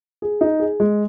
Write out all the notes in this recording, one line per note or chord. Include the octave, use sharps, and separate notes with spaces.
G#4
D#4
G#4
G#3